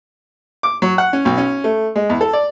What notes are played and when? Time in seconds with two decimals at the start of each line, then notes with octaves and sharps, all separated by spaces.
0.63 D6
0.82 F#3
0.98 F#5
1.13 C#4
1.25 B1
1.38 C#4
1.64 A3
1.96 G#3
2.10 E2
2.21 A4
2.33 D5